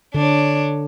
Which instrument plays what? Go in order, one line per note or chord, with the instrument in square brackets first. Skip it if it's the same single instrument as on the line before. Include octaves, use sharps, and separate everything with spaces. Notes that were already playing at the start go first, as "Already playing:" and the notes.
[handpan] D3 [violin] D4 C#5